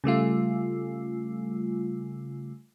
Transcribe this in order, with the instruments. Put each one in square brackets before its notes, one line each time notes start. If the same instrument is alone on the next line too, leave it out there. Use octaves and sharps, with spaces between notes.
[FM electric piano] C#3 G3 A3 F4